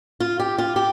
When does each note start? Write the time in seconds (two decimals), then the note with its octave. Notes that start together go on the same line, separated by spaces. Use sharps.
0.20 F4
0.40 G4
0.58 F4
0.76 G4